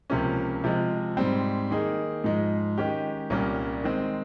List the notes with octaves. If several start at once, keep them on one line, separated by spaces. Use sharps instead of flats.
C#2 C3 F3 A#3 C#4
C3 F3 G#3
G#2 G3 C4
D#3 A#3 D#4 G#4
G#2 F3 G#3
D#3 G#3 C#4 G4
C2 A#2 G3 A#3 C#4
D#3 G#3 C4